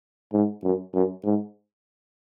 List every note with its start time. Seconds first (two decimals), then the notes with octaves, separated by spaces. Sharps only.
0.33 G#2
0.64 F#2
0.94 F#2
1.25 G#2